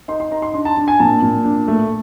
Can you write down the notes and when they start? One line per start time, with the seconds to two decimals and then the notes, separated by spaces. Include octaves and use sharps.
0.08 D#4 C6
0.20 C6
0.31 D#4 A#5
0.42 C6
0.54 D4 C6
0.65 A5
0.77 D4
0.88 G#5
1.00 A#2 A5
1.22 A#2
1.44 D4
1.68 A3